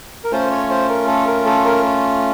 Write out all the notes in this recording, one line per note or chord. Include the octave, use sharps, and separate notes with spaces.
A#4
A3 C#4 F4 C5
C#5
C5
A#4
A4
A#4
A4
A#4